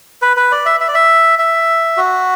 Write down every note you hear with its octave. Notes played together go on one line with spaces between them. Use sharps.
B4
B4
D5
E5
E5
D5
E5
E5
F#4